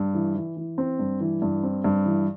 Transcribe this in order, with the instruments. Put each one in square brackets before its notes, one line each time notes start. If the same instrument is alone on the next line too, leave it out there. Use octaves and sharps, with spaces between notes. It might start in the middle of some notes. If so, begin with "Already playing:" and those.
Already playing: [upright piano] G2
E3
E3
E3
C4
G2
E3
G2
C4
G2
E3